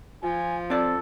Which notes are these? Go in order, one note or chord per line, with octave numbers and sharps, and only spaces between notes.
F3 F4 G#5
C4 A4 D5